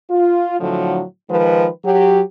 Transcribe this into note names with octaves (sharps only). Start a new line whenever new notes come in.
F4
A2 D3 F3 F#3
D#3 F3 G#3 B4
F#3 G4